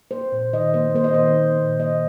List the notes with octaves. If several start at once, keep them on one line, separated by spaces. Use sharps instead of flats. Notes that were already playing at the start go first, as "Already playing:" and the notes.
A#3 C5
A#2
D#3 D#5
A#3 C5
A#3 C5
D#5
D#3 C5
A#3
A#2
A#3 D#5